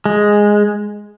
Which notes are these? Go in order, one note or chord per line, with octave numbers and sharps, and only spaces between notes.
G#3